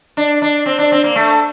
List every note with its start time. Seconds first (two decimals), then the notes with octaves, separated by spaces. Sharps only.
0.17 D4
0.42 D4
0.66 C4
0.79 D4
0.92 C4
1.04 A#3
1.16 A3